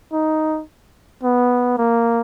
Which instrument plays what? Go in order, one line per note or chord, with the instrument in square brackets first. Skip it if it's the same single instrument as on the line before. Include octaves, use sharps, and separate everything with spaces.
[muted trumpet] D#4
B3
A#3